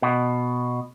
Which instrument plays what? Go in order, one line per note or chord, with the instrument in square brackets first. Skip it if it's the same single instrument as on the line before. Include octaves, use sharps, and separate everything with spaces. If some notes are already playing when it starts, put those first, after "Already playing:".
[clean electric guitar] B2